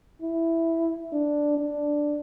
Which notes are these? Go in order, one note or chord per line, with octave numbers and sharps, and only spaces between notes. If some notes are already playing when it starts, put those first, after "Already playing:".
E4
D4
D4